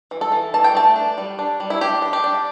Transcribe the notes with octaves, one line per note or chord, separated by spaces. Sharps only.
E3
A4
E3
E3 A5
G5
A3 A5
D4
G3
D4
G3
E4
D4 G4
D4
G4
D4